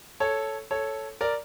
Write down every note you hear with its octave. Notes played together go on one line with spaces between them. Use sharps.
A4 C#5
A4 C#5
A#4 D5